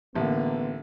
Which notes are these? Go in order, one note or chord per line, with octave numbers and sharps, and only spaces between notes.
A1 D3 A#3 B3